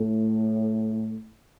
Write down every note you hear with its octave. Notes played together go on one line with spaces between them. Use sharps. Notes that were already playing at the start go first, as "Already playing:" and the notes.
Already playing: A2